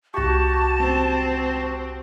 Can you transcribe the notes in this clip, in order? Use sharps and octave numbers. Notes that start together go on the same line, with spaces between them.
C2 F#4 G4 A5 C#6
C4